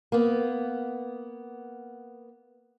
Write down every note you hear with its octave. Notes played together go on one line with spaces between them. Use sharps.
A#3 B3